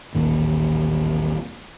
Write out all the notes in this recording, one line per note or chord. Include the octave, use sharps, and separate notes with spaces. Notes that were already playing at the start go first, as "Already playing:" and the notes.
A1 D#2 A#2 D#3